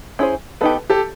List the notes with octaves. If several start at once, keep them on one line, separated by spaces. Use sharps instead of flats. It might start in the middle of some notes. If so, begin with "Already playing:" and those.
C#4 E4 G#4 C5
B3 D#4 G4 A4 B4
G4 A4